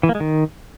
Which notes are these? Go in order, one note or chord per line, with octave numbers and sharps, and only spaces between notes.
E3
A#3
G#3
D#3